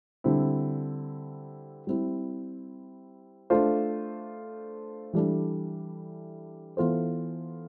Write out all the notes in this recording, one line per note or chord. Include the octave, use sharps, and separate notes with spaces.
D3 G3 C4 E4
G3 C4 E4
A3 D4 F4 A4 C5
E3 G3 D4 A4
E3 B3 F4 A4 C5